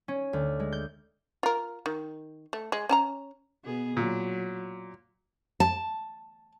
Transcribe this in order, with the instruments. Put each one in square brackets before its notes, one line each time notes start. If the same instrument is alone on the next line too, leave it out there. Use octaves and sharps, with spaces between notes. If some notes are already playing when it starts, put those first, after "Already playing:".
[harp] C#4
D2
G#3
G6
[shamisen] F4 A#4
D#3
A3
G#3
C#4 A5 A#5
[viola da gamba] B2 B3 G#4
[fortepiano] A#2 [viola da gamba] F#3
[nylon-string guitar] A5